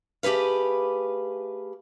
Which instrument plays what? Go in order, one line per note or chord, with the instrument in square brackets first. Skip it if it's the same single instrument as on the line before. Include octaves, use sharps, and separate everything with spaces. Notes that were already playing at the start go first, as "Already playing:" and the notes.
[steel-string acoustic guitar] A3 G4 G#4 B4 F5